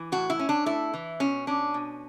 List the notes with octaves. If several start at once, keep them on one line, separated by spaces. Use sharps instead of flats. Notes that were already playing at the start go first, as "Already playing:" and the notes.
Already playing: E3
A2 F#4
E4
C#4
D4
A3 E4
E3
B2 C#4
C#4 D4
B2